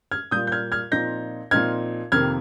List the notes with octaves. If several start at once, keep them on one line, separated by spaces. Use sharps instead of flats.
F6 G#6
A#2 G3 A#3 F4 D#6 G6
G6
F6 G#6
F6 G#6
A#2 F3 C4 D#4 G6 A#6
A#2 F3 C4 D#4 F6 G#6
F2 C3 D#3 A#3 F6 G#6